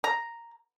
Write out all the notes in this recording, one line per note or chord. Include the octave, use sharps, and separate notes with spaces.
A#5